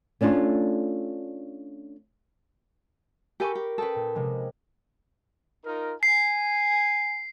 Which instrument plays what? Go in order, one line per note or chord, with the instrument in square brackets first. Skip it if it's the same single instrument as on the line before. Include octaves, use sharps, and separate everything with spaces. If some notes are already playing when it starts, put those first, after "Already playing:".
[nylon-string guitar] A3 C#4 D4 F4
[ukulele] G4 A4 G#5 [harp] A#4 B5 C#6
[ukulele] G4
[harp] C#4 G5 D#6 [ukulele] A4 B4
[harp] A#2
C3 F3 G#3
[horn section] D#4 F4 A#4
[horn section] G#5 [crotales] C7